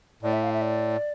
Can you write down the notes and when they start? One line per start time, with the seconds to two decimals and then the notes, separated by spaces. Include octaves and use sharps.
0.23 A2 D5
0.33 E5
0.43 F5
0.53 E5
0.62 D5